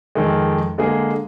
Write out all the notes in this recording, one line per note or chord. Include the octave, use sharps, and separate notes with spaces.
F2 D#3 G#3
D3 G#3 A#3 G#4